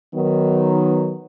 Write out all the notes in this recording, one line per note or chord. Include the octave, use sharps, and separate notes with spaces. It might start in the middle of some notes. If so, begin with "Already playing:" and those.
D#3 F#3 B3